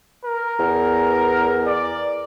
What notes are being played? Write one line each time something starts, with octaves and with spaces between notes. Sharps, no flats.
A#4
E2
D5